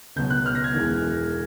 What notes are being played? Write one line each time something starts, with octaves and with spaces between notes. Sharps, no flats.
C#2 B2 F#3 G6
F#6
F6
A#6
G#6
E1 E2 B2 G#3